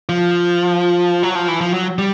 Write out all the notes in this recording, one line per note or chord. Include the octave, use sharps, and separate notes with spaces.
F3
F#3
F3
E3
F3
F#3
G3